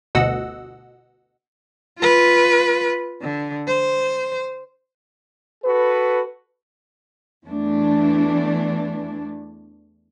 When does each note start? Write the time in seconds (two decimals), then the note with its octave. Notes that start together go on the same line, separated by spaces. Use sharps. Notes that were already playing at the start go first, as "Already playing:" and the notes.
0.15 G1 D2 B2 D#5 F#5 E6
1.99 F4 B4
3.22 D3
3.68 C5
5.65 F#4 A4 B4
7.45 E2 E3 A3 D4